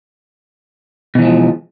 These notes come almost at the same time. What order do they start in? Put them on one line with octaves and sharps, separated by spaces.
B2 E3 G#3 F3